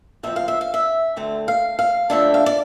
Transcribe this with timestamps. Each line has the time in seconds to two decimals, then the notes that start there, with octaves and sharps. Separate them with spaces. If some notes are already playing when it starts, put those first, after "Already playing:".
0.23 D2 D3 F3 C4 E5
0.36 F5
0.48 E5
0.61 F5
0.74 E5
1.16 D2 D3 A3 C4
1.48 F5
1.79 F5
2.10 F2 D3 A3 D4 E5
2.34 F5
2.46 D5